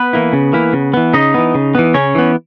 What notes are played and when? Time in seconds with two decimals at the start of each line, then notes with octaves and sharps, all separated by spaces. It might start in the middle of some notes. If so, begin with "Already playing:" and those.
Already playing: B3 B4
0.13 E3 A#3 E4
0.33 C#3
0.53 E3 A#3 E4
0.73 C#3
0.94 E3 B3
1.13 C#3 D#4 D#5
1.34 E3 B3
1.55 C#3
1.75 E3 B3
1.94 C#3 C#4 C#5
2.15 E3 B3